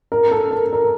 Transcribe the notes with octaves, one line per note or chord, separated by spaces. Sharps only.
A#4
A4
A#4
A#4